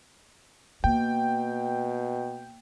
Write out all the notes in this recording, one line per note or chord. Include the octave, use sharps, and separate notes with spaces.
B2 A#3 G5